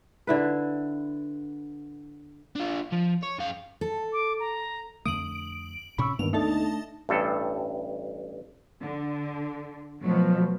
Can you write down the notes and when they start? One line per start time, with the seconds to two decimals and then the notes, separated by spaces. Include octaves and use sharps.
0.27 D3 E4 B4
2.55 D4 F4
2.92 F3
3.23 C#5
3.38 F#2 F5
3.81 A4
4.13 D6
4.40 A#5
5.06 F2 D3 A3 D#6 D7 F#7
5.98 A2 C3 C#4 B5 C#6 E6
6.19 D2 G2 D#3 A#3 B3 F7
6.33 A3 D4 D#4 A4 A5
7.09 A1 G2 A4
8.81 D3
10.01 B2 F3 F#3 A3